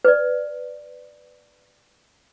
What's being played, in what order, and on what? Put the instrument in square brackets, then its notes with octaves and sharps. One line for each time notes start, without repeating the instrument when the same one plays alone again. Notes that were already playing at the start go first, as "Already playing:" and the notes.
[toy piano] B4 D5